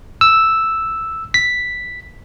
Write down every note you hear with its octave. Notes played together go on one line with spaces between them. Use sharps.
E6
B6